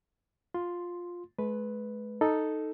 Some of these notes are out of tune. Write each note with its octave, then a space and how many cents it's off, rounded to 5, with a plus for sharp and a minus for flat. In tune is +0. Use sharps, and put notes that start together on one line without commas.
F4 +10 C6 +0
G#3 +40 B4 +0
D#4 +0 A4 +0